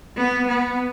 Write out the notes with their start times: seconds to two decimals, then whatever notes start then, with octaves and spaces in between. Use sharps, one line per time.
0.17 B3
0.48 B3